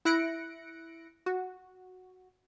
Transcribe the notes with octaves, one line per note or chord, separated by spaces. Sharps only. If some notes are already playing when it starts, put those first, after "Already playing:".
E4 E5 F#6 A#6 C#7 D7
F#4